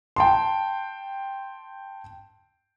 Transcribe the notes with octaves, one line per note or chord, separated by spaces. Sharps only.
G5 A5 C6